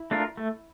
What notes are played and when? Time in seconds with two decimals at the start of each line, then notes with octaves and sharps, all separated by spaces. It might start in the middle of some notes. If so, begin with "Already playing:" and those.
Already playing: E4
0.11 A3 D4 F4 A#4
0.37 A3